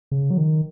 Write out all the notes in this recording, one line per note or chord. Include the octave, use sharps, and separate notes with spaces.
C#3
F#3
D#3